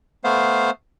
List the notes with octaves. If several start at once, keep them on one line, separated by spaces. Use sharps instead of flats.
A3 B3 C5 F5